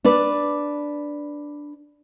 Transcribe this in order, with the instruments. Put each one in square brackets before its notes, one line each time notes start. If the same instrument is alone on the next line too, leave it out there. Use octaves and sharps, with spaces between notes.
[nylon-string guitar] D4 B4 D5